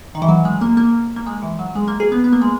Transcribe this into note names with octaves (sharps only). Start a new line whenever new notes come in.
D#3
E3
F#3
G#3
A#3
A#3
A#3
G#3
E3
F#3
G#3
A#3
G#4
B3
B3
A#3
G#3